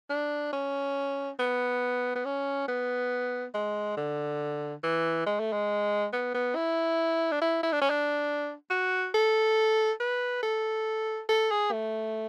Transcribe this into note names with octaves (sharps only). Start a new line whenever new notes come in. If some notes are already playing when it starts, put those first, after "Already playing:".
D4
C#4
B3
B3
C#4
B3
G#3
D3
E3
G#3
A3
G#3
B3
B3
E4
D4
E4
E4
D4
C#4
D4
F#4
A4
B4
A4
A4
G#4
A3